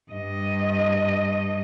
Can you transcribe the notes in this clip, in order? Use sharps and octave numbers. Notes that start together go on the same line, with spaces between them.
G2 D#5